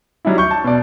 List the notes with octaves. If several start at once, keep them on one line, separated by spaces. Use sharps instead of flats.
F#3 G3 D#4 E4
C#6 G6
A5
B2 D5